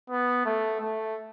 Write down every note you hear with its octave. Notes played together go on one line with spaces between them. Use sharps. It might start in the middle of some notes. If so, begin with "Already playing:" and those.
B3
A3
A3